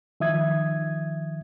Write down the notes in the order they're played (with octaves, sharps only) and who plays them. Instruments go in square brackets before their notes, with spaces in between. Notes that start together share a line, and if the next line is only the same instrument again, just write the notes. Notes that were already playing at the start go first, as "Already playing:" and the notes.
[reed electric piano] D#3 F3 E5 D#6 G#6